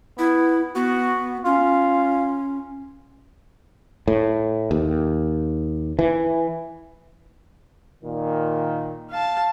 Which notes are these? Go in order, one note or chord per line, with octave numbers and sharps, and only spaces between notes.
B3 E4
B3 F#4
C#4 F4
A2
D#2
E3
A#2 D#3
F5 A5